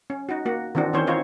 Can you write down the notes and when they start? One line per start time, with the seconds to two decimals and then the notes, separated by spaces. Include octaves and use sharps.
0.10 C#4
0.29 D#4 F#4
0.45 A#3 F#4
0.75 D#3 E3 C4 D4 F#4
0.93 D#3 E3 C4 C#4 C5 C#5
1.07 C4 D#4 F4 C5 C#5